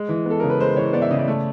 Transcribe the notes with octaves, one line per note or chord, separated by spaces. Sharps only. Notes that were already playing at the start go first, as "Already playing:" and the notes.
Already playing: G#3
E3
B3 A4
C#3 A#4
B4
G#3 C5
E3 C#5
B3 D5
E5
C#3 D#5
D5
A3